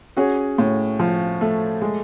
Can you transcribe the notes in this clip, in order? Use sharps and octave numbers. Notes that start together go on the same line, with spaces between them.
C#4 F#4 G#4
A2
F3
A3
G#3